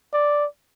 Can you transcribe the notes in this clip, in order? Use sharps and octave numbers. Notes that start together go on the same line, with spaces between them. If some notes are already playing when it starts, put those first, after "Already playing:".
D5